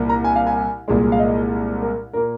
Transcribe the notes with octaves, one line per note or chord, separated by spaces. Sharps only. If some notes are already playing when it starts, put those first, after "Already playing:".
Already playing: C2 A#2 A#3
A#5
G#5
F5
G#5
C2 A#2 G#3
F5
D#5
A#4
A#2 A#3 A#4